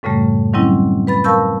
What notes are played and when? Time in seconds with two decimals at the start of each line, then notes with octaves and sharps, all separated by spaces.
0.03 F#2 A2 C#3 G3 A3
0.53 D#3 F#3 G3 C4 C#4 E4
1.07 B4 B5 A6
1.24 A#4 F5 A5 C#6 E6 G6